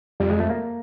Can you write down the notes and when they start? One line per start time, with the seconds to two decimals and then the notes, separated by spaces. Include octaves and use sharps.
0.20 F2 G3
0.30 G#3
0.40 A3
0.50 A#3